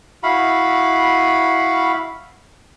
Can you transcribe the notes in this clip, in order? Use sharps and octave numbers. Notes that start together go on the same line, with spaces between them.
E4 F#4 F5 B5